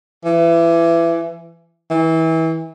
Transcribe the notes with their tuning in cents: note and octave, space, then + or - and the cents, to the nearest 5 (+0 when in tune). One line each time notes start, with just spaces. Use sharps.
E3 +25
E3 -25